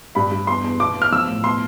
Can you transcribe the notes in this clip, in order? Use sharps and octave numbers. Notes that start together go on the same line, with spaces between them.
G2 B5
G2
E2 C6
E2
B2 D6
E2
F6
F3 E6
A2
B2 C6